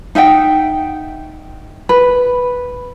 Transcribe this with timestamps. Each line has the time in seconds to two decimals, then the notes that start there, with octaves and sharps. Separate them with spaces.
0.15 D#4 E5 F#5 G5
1.89 B4